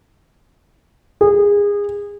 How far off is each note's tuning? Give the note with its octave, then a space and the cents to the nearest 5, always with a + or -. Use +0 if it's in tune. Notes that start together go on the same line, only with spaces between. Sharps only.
G#4 -25